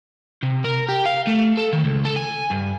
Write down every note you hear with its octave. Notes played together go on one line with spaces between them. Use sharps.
C3
A#4
G4
F5
A3
A4
D#3
C#2
A4
G#5
G2